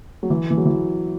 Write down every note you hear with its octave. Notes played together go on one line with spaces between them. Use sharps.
F#3
E3
E3
F#3
E3